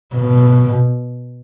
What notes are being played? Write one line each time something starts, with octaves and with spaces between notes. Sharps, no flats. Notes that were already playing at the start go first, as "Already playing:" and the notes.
B2